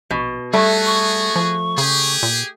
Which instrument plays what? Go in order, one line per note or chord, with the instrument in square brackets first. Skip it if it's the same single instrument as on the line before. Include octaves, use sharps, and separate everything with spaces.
[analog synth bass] A#1 [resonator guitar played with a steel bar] B2
[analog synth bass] G3 [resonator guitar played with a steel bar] A3 [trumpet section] B3 F#4 G#4
[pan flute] C#6
[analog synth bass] F3
[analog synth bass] C#3 [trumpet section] G4 G#4
[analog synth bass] A#2